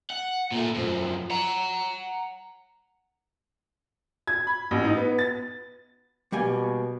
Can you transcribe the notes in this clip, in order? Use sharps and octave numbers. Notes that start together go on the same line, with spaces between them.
F#5
A#2 A3
F#2 F3
F#5 A#5
G#6
B5
A1
D#4
B3
A6
B2 G3 A#3 G#5